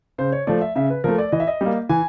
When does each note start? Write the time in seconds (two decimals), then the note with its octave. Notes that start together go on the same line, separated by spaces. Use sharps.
0.18 C#3 C5
0.32 C#5
0.47 F3 A3 D5
0.61 E5
0.76 C#3 E5
0.90 B4
1.04 F3 A3 A#4
1.18 D5
1.32 E3 D#5
1.40 E5
1.47 D#5
1.61 G3 A#3
1.89 E3 G#5